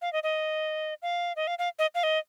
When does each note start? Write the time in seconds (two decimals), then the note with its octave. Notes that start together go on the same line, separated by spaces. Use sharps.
0.02 F5
0.13 D#5
0.23 D#5
1.02 F5
1.36 D#5
1.47 F5
1.59 F5
1.79 D#5
1.95 F5
2.03 D#5